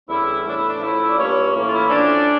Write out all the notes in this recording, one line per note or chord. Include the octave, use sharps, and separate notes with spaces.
E2 D3 G3 C#4 E4
A2 E3 A3 D4
E4
D4
A2 F3 A3 C#4 E4
D5
G2 F3 A#3 C#4 C#5
A2 E3 A#3 C#4
F4
E4
A2 F3 C#4 D4